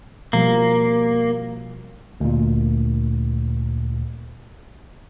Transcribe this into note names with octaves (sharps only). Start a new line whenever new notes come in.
B2 F3 G3 A#3
D2 A#2